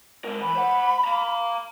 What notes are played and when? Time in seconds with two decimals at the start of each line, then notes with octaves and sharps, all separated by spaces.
0.24 G#3 A#4
0.41 E3 B5
0.55 C5 F#5
1.04 F5 A#5